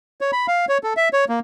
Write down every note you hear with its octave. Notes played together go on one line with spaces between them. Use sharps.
C#5
B5
F5
C#5
A4
E5
C#5
A#3